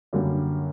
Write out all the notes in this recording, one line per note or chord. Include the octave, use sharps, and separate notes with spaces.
F#2 D3 G3 A#3